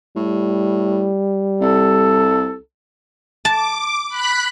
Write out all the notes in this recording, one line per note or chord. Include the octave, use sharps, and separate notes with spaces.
A2 G3
C2 A4
A5 D6
B5 F#6 B6